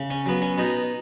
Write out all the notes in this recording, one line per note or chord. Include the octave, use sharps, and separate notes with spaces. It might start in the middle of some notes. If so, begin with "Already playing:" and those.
Already playing: C#3
C#4
F#3 B3
C#4
B2 D#4